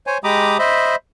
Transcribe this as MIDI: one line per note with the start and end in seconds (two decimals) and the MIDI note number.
0.07 0.18 72
0.07 0.18 73
0.07 0.18 80
0.24 0.58 56
0.24 0.58 67
0.24 0.58 82
0.24 0.58 83
0.24 0.58 86
0.24 0.58 87
0.59 0.95 72
0.59 0.95 75
0.59 0.95 76
0.59 0.95 83